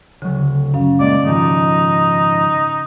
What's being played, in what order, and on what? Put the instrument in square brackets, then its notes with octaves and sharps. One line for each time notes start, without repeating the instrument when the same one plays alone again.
[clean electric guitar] D2 F#3 [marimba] C#3
[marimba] F#2 C#4 F5
[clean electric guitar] A#2 G#3 A#3 [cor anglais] D5 [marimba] D#5
[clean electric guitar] G#2 D#3 F3 [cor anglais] D#4